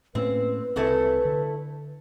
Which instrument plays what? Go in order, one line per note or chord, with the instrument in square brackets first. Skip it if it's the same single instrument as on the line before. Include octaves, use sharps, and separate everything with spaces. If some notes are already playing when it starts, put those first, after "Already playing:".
[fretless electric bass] A2 A#3 C#4 [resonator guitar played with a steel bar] C4 [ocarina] B4
[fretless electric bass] C2 C4 [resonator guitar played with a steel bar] C#3 A3 E4
[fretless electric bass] D3